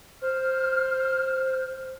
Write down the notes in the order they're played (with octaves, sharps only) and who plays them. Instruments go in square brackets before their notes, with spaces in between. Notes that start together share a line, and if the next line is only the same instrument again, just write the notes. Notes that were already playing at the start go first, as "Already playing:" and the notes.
[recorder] C5 [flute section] F6